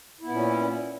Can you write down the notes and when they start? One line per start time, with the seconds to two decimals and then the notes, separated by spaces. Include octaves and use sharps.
0.20 E4
0.25 B3
0.29 A#2
0.33 C#4